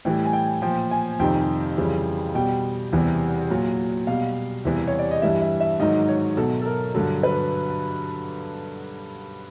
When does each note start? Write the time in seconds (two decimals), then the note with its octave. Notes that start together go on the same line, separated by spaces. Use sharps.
0.05 A2 E3 G3 G5
0.25 G#5
0.33 G5
0.62 A#2 F3 G5
0.91 G#5
1.19 F2 C3 D#3 G3 G5
1.77 F2 C#3 E3 G3
2.35 B2 G3 G5
2.92 E2 C3 E3 G3
3.50 A#2 F#3
4.07 B2 G3 F5
4.65 E2 C3 E3 G3
4.88 C#5
4.99 D5
5.11 D#5
5.22 G2 E3 G3 E5
5.41 E5
5.60 E5
5.79 G#2 D#3 F#3 D#5
6.09 C#5
6.37 B2 F#3 A4
6.62 A4
6.66 A#4
6.95 G2 D3 F#3 A4
7.23 B4